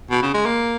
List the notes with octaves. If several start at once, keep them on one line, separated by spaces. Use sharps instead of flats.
B2
C#3
G#3
A#3